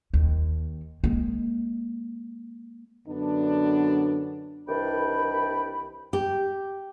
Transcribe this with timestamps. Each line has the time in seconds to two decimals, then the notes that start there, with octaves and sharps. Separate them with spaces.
0.14 D#2
1.04 G#3 A#3
3.07 F#2 D3 B3 D4
4.68 C2 D#3 E3 D4 G5 B5
6.13 G4